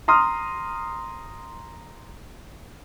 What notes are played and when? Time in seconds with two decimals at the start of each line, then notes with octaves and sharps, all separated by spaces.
0.08 A#5 C6 D#6 F6